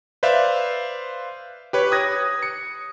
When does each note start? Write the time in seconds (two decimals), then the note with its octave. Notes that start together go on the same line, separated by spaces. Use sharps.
0.23 B4 C5 D5 E5 F5
1.73 G4 B4 C#5
1.92 D#6 F#6 G#6 A#6
2.43 C#7